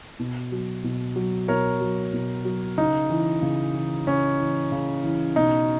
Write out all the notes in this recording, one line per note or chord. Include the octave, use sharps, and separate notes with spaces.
B2
F#3
B2
F#3
B2 A#4 C#5
F#3
B2
F#3
C#3 D#4
E3
C#3
E3
C#3 C#4
E3
C#3
E3
B2 D#4